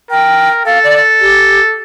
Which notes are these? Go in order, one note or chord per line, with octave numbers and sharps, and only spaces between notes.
A#4 G5
A4 F5
D5
G4